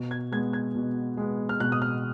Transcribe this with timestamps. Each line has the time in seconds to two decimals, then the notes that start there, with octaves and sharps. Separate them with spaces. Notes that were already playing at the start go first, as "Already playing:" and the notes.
Already playing: B2
0.11 G#6
0.32 G#3 B3 G#6
0.53 G#6
0.75 B2
1.17 G#3 B3
1.49 F6
1.60 B2 F#6
1.72 D#6
1.82 F6